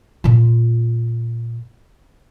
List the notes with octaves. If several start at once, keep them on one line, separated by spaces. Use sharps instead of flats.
A#2 F4